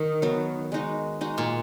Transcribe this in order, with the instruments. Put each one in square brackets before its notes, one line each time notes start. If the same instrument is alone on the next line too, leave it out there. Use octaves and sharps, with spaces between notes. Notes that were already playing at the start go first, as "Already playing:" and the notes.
Already playing: [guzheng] D#3
[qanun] F#3 B3 F#4
G#3 D#4 F#4
G#3 D#4 F#4
[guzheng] A#2